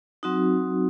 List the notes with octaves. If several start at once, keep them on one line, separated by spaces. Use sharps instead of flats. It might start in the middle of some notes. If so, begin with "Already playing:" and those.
F#3 C4 D#4 F#4